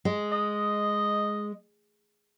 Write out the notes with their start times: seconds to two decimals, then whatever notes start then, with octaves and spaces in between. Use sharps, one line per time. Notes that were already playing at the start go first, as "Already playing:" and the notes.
0.05 G#3
0.32 D#5